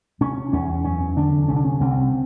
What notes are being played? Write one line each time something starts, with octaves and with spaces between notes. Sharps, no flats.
C3 C#4
E2 C#4
F#2 C#4
D3 D4
C2 C#4
D4
C#4
C2 C4